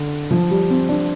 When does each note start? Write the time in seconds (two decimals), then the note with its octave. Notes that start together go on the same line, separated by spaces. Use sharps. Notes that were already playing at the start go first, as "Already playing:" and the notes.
Already playing: D3
0.31 F3
0.51 G3
0.70 C4
0.89 D4